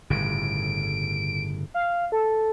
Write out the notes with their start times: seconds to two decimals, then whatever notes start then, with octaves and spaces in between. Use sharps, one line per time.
0.10 G1 A2 C#3 D7
1.74 F5
2.12 A4